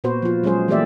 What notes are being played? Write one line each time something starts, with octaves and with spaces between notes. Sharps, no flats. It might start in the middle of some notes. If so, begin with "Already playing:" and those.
A#2 B3 F#4 B4 C5
F3 F4
F#3 G#3 C#4 G#4 C5
E3 A3 A#3 G4 D5 E5